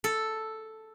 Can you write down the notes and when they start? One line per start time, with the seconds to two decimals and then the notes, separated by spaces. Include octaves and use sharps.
0.04 A4